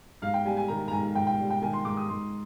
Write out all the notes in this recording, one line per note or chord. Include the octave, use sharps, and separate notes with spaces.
G#2 F5
G5
G3 G#5
G#5
D#3 A#5
A#5
G#2 G#5
G#2 G5
G5
G3
G5
D#3 G#5
C6
G#2 D6
D#6
G#2 C6